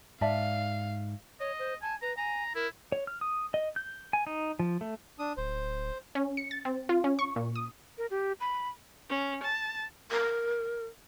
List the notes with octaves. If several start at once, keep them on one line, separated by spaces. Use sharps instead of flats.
G#2 D5 E5 F5 A5
C#5 D#5
C5
G#5 A5
B4 A#5
G#5 A#5
E4 A#4
C#5
F6
D#6
D#5
G6
G#5
D#4
F3
A3
D4 D#6
D1 C5
C#4
C#7
A6
C4
F4
C#4
C#6
A#2
D#6
A#4
G4
B5
C#4
A5
A#4